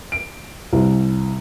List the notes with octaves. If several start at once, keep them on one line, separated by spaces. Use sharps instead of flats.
D7
C2